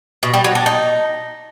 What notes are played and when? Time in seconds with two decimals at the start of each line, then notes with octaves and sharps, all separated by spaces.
0.23 B2
0.34 G3
0.44 F#3
0.55 D4
0.66 D#4